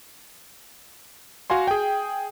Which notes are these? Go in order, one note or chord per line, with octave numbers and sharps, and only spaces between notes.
F#4 F5 G#5 C6
G#4 G5